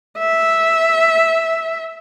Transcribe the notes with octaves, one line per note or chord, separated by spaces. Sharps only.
E5